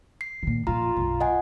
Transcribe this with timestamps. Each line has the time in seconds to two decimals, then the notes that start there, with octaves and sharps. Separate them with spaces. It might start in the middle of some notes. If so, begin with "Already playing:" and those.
0.21 C7
0.43 A#2 D#3
0.67 F2 A#2 F4 A#5
0.97 B1 F#2
1.21 D#5 F#5 G#5